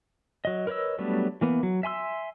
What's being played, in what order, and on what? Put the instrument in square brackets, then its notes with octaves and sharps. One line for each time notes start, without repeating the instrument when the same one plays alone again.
[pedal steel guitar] F#3 D#5
A#4 B4 C#5 D#5 E6
F#3 G3 A3 B3 D4
E3 A#3 B3
F#3
E5 G#5 C6 E6